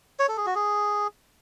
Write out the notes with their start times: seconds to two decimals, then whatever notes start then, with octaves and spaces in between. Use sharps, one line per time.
0.19 C#5
0.28 A4
0.37 G#4
0.46 F#4
0.55 G#4